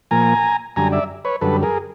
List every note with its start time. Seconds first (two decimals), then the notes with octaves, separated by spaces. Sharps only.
0.11 A#2 F3 A#3 G#5 A#5
0.76 F#2 D3 G3 G#5 A#5
0.92 D5 E5
1.25 B4 C#5
1.41 F#2 D3 G3 A4 B4
1.63 G#4 A#4